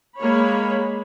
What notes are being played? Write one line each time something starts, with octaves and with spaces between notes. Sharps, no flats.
G#3 A#3 C#5 B5